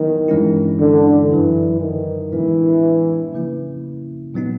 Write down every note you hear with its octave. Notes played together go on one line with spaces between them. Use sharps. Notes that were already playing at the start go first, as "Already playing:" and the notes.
Already playing: D#3 F#3 B3 E4
G2 E3 G#3 C#4 E4
D3
F#2 D3 E3 F#3
D#3
A2 E3 F3 G#3 B3 D4
C#3 F3 A#3 C#4 E4
A#2 F#3 B3 D#4